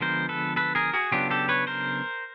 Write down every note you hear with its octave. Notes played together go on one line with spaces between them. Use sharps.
D3 F3 G#3 B3 A#4 C5
A4 B4
A4 B4
G#4 A#4
F#4 G#4
C#3 F#3 B3 D4 F4 G4
G4 A4
B4 C#5
A#4 C5